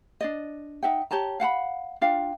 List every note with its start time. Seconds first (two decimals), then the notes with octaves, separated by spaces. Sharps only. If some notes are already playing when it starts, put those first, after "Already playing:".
0.21 D4 D5 D#5
0.83 D#4 E5 F#5 G5
1.11 G4 C#5 A5 A#5
1.40 F5 F#5 A5 B5
2.01 D4 F4 F5 G5